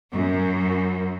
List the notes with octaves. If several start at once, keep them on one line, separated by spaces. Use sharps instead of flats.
F#2